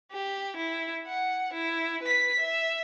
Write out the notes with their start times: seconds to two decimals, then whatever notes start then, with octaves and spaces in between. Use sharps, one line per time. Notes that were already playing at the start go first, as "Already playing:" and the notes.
0.12 G4
0.57 E4
1.07 F#5
1.54 E4
2.03 B4 B6
2.40 E5